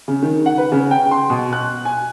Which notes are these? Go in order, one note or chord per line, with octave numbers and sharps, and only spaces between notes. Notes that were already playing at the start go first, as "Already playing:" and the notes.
C#3
D#3
F#5
B4
C#3
G5
C6
B2
F#6
G#5